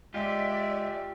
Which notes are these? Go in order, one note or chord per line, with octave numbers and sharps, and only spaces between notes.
G#3 F4 G4 D5 E5